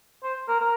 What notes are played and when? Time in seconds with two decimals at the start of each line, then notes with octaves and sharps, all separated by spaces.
0.23 C5
0.48 A#4
0.60 A#4